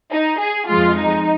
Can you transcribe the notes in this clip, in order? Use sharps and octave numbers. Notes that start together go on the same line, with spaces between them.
D#4
G#4
F2 F3 G#3 F4
D#4